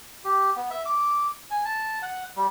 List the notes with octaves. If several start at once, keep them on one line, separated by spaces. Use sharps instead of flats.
G4
B3
E5
D6
G#5
A5
F#5
G3